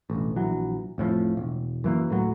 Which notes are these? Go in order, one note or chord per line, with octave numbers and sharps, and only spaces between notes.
E1 A1
A#1 E3 F#3
F1 A2 C#3 F3
E1
F#2 E3 A#3
D1 A2 F#3